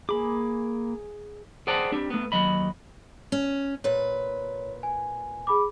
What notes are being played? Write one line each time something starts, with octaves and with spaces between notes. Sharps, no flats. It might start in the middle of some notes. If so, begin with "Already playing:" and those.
A#3 G#4 B5 D6
G#4 C5 D5 F#5 G5 A5
C4 D4 G4
A3 B3
D#2 F#3 D#5 B5
C#4
A#2 B4 C#5
G#5
G#4 B5 D6